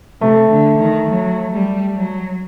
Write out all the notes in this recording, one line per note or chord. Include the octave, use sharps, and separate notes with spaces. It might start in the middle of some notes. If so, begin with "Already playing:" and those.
C3 A3
D3
D#3
F#3
G3
F#3